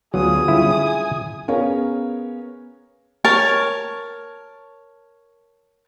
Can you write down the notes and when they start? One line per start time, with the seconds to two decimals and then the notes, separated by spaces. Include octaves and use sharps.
0.14 D2 F#3 B3 F4 G#4 D#6
0.48 D3 G3 C#4 E4 F4 E5
0.85 G#5
1.48 B3 C#4 G#4 A#4 C#5 F5
3.25 A#4 C#5 A5